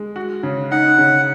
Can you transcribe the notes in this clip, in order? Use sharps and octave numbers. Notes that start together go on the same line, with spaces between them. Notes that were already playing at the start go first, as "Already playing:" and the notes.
Already playing: G#3
F#4
C#3
D#4 F#5
C#3